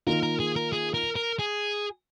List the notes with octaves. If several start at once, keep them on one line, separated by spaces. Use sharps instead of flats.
D#3 A#3 F4 A#4
A#4
G#4
A#4
G#4
A#4
A#4
G#4